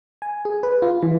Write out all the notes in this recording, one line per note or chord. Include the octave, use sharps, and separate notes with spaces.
G#5
G#4
B4
F4
E3